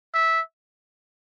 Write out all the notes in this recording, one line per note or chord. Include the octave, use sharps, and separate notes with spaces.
E5